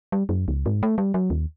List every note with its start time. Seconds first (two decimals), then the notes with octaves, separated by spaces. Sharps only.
0.12 G3
0.29 F#2
0.48 C#2
0.66 G#2
0.83 A3
0.98 G3
1.14 F#3
1.30 D#2